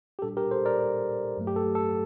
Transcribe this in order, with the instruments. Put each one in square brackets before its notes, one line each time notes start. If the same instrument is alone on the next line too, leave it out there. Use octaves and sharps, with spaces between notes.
[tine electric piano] G4
A#2 G3 D4 A4
G4 A#4
A4 C5
A#4 D5
G2 F#3 A3
G4
A4
A4